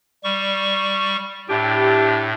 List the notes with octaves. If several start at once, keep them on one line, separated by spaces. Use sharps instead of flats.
G3 C#6
A2 D4 E4 G4